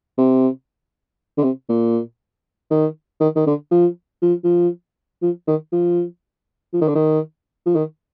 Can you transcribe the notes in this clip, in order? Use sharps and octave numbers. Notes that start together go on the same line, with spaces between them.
C3
D3
C3
A#2
D#3
D#3
D#3
D3
F3
F3
F3
F3
D#3
F3
F3
D#3
D3
D#3
F3
D#3